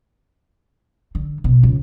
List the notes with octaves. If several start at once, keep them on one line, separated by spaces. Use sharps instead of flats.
D3
B2
C#2